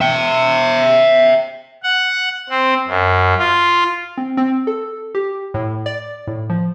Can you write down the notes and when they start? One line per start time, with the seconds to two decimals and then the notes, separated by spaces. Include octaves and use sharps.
0.01 E5 G5
1.83 F#5
2.49 C4
2.87 F#2
3.39 F4
4.18 C4
4.37 C4
4.67 A4
5.15 G4
5.54 A2
5.86 D5
6.27 A2
6.50 F3